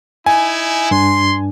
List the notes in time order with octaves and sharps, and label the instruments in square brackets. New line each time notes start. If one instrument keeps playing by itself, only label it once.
[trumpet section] D#4 E4 [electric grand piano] G#5
[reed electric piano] G2 D4 [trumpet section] C6